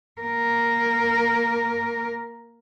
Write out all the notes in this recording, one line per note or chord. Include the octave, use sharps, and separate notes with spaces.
A#3 A#4